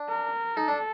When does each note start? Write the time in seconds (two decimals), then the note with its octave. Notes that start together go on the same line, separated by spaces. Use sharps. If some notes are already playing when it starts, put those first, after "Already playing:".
Already playing: D4
0.09 A#4
0.56 D#4 A4
0.68 D4